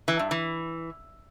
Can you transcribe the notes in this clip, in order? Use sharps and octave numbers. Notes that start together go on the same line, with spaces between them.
E3
G2
E3